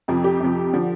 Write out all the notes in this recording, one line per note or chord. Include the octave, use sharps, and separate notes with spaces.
F2 C3 F3
G4
F2 C3 F3
D3 F3